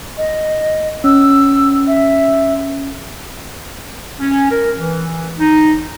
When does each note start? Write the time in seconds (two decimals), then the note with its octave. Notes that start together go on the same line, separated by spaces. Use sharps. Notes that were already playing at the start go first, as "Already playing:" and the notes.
0.17 D#5
1.04 C#4 E6
1.87 E5
4.20 C#4
4.51 A#4
4.77 E3
5.39 D#4